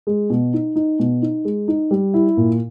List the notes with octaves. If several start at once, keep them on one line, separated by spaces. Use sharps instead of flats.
G#3
B2
D#4
D#4
B2
D#4
G#3
D#4
G3
E4
A#2